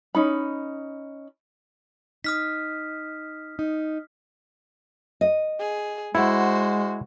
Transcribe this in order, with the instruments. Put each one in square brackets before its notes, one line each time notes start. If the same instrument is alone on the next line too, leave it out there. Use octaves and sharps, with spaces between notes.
[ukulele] C#4 D#4 B5
[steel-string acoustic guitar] D#4 [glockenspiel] D#6 F6 B6
[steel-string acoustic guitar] D#4
[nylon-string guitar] D#5
[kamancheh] G#4
[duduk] G#3 [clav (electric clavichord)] E4 [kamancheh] F#4 C5 [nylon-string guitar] F#5